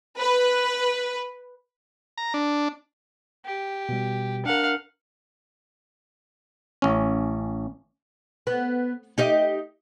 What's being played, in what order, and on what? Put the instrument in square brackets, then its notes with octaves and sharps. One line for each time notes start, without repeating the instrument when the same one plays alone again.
[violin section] B4
[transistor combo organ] A#5
D4
[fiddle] G4
[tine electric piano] B2 G3
[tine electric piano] D4 A#4 [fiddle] F5 F#5
[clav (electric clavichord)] A1 C#4
[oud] B3
D#4 G4 D#5